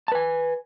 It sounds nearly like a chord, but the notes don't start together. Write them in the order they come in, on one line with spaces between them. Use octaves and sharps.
A5 B4 G#5